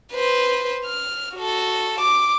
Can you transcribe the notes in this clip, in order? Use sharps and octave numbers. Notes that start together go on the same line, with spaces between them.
B4 C5
F6
F#4 A4
D6